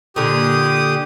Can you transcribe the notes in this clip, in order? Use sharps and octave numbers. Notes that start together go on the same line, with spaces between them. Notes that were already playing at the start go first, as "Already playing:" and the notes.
A#2 D3 G4 D#6